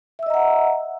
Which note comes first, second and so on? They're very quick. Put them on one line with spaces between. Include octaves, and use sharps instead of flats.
E5 E6 D#5 A#5 F#5